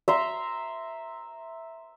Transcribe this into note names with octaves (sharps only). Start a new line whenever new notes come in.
E5 A#5 C6